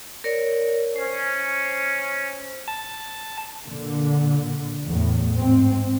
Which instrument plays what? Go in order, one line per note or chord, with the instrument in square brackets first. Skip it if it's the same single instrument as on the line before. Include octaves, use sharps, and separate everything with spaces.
[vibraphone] A#4 C#5 D5
[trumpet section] C#4 [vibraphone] C5
[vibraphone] C5
[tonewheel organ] A5
[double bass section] A#2 D3
E2 A2
G#2 C4